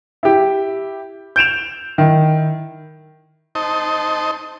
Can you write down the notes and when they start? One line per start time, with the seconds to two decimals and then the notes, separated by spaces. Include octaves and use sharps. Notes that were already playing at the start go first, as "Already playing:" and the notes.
0.23 E4 G4
1.36 G6 D7 E7 F7
1.98 D#3 E4
3.55 D#4 C5 D#5 A5